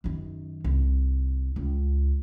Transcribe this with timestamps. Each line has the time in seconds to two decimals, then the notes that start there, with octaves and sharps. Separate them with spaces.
0.04 F#2 D#3
0.64 C2
1.56 C#2